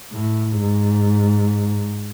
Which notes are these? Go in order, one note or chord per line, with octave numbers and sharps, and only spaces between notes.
A2
G#2